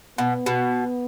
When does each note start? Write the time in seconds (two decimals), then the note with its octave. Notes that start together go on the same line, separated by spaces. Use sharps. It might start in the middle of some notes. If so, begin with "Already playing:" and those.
0.18 B2 B3
0.46 B2